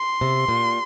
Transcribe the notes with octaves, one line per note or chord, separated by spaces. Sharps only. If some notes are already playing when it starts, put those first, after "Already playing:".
Already playing: C6
C3
A#2